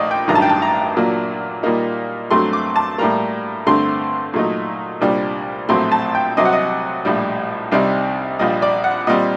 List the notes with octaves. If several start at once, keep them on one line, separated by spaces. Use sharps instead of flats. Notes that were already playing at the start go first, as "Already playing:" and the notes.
Already playing: A#1 A#2 A3 D#4 D5 D#5
G5
A1 G2 D#3 F#3 A#5
A5
G5
A5
A#5
A#2 F#3 A#3 D4
A#2 G3 A#3 D#4
G2 F#3 A3 C4 C6
D6
A5
A2 G3 A#3 A#5
G2 D3 A3 C4 C6
A#2 F#3 A3 D#4
C2 A#2 G3 D4
A#1 A2 F#3 A3 C4 C6
A5
G5
C2 C3 F#3 D#5
F#5
D#5
A#1 A2 G3
C2 C3 G3 C4 D#4
A#1 A#2 G3 D#5
D5
F#5
A#2 G3 C4 D#5